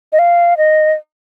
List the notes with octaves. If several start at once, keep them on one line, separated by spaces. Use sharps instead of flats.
D#5
F5
D#5